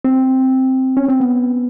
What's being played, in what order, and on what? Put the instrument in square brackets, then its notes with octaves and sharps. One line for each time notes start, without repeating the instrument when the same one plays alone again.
[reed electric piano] C4
C#4
C4
B3